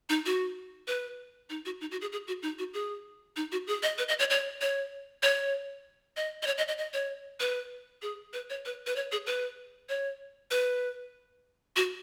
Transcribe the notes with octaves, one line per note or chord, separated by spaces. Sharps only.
D#4
F#4
B4
D#4
F#4
D#4
F#4
G#4
G#4
F#4
D#4
F#4
G#4
D#4
F#4
G#4
D#5
B4
D#5
C#5
C#5
C#5
C#5
D#5
D#5
C#5
D#5
D#5
D#5
C#5
B4
G#4
B4
C#5
B4
B4
C#5
G#4
B4
C#5
B4
F#4